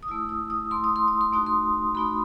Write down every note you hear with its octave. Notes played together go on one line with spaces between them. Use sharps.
D#6
A3 E4 E6
D#6
D#6
A3 E4 C6
D#6
C6
D#6
C6
A3 D#4 F#4 D#6
C6
A3 D#4 F#4 B5